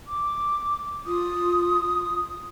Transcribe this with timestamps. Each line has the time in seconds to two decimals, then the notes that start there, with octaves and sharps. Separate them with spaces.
0.08 D6
1.06 F4 D#6